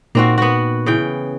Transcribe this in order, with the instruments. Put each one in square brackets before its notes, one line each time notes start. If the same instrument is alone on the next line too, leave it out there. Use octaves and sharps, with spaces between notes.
[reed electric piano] A#2 D#4 [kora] A#3 C4 F#4
[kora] B3 F#4
C#3 E3 G5